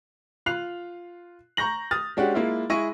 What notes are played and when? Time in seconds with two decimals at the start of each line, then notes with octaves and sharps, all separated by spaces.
0.46 F4 F#6 C7 F7
1.57 A#5 C#6 G6 A#6 F#7
1.91 D#6 F6 A6
2.17 G#3 C#4 D4 F#4 G4
2.34 G#3 A#3 E4 F4
2.70 G#3 E4 G#4 C#6 A#6 D#7